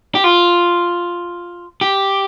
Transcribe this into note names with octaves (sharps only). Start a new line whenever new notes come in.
G4
F4
G4